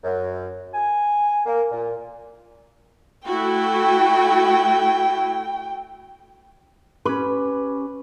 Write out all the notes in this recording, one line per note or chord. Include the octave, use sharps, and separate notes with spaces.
F#2
G#5
A#3
A#2
A3 E4 F#4 G5
C#4 G4 B4 B5